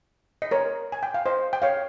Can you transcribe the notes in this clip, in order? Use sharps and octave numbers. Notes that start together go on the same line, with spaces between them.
D#5
A#4 C#5
G#5
G5
F5
C5 D#5
G5
C#5 F5